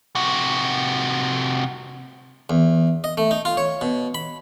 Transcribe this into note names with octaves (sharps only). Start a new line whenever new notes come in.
C3 F#4
E2
D#5
A3
D#4
F4
C#5
B2
B5